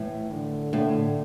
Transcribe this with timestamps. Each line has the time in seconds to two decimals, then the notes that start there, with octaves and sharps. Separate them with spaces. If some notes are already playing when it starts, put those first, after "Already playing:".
Already playing: A2 E3
0.31 D3
0.73 A2 D3